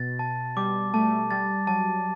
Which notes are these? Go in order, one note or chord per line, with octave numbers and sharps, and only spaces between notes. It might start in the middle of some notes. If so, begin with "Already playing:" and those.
Already playing: B2 A6
A5
G3 D6
A3 A5
G3 A6
F#3 A5